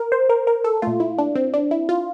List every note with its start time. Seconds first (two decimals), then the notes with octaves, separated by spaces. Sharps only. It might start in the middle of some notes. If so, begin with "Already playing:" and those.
Already playing: A#4
0.12 C5
0.29 A#4
0.47 A#4
0.64 A4
0.82 A#2 A3 F4
1.00 E4
1.18 D4
1.35 C4
1.54 D4
1.71 E4
1.89 F4